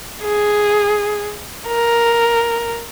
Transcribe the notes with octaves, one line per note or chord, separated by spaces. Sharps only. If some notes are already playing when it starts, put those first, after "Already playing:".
G#4
A#4